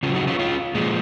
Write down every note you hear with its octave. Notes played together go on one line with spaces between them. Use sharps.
C#3 F#3 C#4 F4
D#4 F#4
C#4 F4
C#4 F4
A#2 F3 G#3